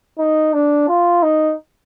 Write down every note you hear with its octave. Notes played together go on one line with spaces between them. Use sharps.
D#4
D4
F4
D#4